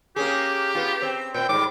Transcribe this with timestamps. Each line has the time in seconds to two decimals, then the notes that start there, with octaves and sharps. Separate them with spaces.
0.16 A#3 C#4 G4 G#4
0.75 B3 F4
1.02 C4
1.34 A#2 C4 G5
1.49 G#2 G3 D6